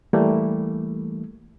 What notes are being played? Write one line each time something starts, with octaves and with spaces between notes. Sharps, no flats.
E3 G3 A3 A#3